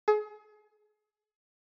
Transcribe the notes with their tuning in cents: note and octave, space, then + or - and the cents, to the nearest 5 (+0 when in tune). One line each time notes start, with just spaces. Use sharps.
G#4 +35